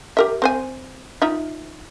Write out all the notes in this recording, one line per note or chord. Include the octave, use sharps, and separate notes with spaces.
G4 A#4 E5
C4 C5 G#5
D#4 F4 E5